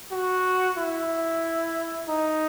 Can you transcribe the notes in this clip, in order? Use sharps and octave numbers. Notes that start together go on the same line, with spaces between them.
F#4
E4
D#4